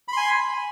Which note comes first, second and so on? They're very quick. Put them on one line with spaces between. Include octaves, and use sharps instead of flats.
B5 C6 G#5